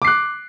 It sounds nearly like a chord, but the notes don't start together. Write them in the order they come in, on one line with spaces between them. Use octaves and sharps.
D6 C7 F#6